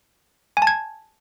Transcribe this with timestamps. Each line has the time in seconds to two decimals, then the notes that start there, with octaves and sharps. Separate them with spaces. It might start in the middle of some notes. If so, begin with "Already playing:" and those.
0.57 G#5
0.62 A5
0.67 G#6